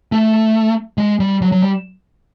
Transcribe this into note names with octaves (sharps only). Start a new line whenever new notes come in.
A3
G#3
G3
F#3
F#3
G3